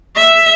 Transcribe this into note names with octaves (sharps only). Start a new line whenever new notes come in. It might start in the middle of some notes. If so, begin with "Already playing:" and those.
E5